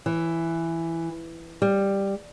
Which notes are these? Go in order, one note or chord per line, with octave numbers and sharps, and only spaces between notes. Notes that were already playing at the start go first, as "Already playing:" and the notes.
E3
G3